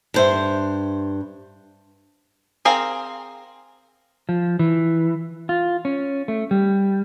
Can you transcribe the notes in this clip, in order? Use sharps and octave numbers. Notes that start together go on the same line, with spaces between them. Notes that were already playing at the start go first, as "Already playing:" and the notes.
G2 C5 E5
C4 G#4 A#4 F5
F3
E3
F4
C#4
A3
G3